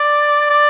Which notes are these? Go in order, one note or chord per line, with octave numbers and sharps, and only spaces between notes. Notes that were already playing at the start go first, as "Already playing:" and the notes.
Already playing: D5
D5